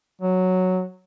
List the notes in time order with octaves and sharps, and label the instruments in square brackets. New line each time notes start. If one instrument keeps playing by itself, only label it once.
[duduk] F#3